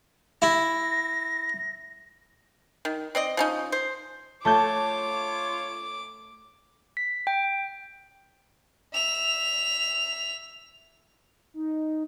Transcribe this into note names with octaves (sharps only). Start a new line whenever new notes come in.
E4 A#6
D#3
C4 D5 D#5
F3 C#4 D#4
C5
A3 F4 C#5 A5 D6 G6
B6
G5
E5 F7
D#4